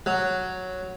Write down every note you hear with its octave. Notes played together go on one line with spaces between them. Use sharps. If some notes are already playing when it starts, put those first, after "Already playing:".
F#3